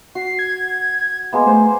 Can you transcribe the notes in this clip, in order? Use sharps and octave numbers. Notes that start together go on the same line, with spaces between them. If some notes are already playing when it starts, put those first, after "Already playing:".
F#4 C7
G#6
G#3 A#3 B3
A3 C5